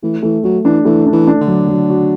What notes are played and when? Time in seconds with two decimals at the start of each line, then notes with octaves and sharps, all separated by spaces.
0.03 E3 A3
0.22 E3 A3
0.44 F#3 A3
0.64 E3 D4
0.85 E3 A3
1.07 D4
1.12 E3
1.27 D4
1.41 D3
1.47 F#3
1.69 F#3
1.90 F#4